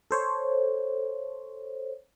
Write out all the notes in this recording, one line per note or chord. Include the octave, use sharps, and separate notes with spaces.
A4 C5 C#5